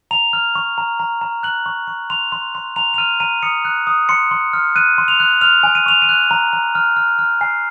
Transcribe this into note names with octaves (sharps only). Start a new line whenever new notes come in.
A#5 F7
F6
C#6
A#5
A#5
A#5
F#6 F#7
C#6
C#6
C6 F7
C6
C6
A#5 F7
F7
F6 D#7
A#5 D#7
D#6 C#7
F#6
D#6
C6 C#7
C6
F6
F#6 D#7
C6
F7
F#6
F6 F7
G#5
D#7
C#6 F7
D#7
F#6
A#5
A#5
F6
F6
F6
G#5 C7